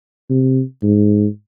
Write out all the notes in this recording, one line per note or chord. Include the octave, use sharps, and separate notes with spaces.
C3
G#2